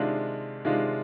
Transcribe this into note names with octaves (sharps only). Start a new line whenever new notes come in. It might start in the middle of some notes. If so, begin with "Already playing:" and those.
Already playing: C3 D#3 G#3 D4 F4
C3 D#3 G#3 D4 F4